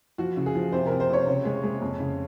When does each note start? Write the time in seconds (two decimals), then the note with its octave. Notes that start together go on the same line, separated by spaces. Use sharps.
0.18 F3 F#4
0.37 C#3
0.46 G#4
0.55 F3
0.72 C3 C5
0.87 C3 A#4
1.00 C5
1.09 C3 C#5
1.27 C#3
1.45 G#3
1.63 G#3
1.82 F2
2.00 C#3